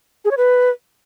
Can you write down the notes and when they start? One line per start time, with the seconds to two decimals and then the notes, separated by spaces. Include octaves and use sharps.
0.25 G#4
0.31 C#5
0.37 B4